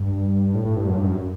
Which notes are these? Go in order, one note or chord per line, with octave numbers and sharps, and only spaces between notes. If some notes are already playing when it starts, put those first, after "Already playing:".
Already playing: G2
A2
A2
G2
F#2
G2
F#2